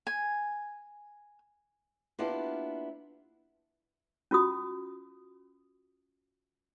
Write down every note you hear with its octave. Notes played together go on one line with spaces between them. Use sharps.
G#5
A#3 B3 D4 E4 F4 G4
C#4 F4 F#4 D#6